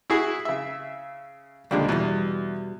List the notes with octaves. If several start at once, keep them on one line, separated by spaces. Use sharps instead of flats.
E4 F#4 G#4
C#3 E5
C#2 A#2 D3 F3 G3 G#3
E2 B2 G3